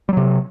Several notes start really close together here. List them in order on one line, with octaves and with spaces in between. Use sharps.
G3 F#3 C3